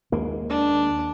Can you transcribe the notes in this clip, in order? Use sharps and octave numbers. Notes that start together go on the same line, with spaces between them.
D#2 G#3 A#3
D4